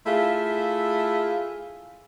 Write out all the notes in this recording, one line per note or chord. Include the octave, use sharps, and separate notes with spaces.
A3 E4 F4 G#4